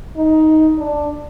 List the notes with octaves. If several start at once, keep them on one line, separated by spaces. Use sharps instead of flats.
D#4
D4